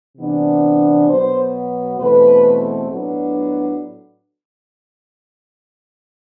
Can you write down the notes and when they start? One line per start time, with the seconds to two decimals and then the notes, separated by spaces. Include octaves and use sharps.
0.18 C3 E3 B3 D4
1.08 B2 F#3 B3 C5
1.99 E2 B2 A3 C4 B4
2.89 A2 F#3 B3 D4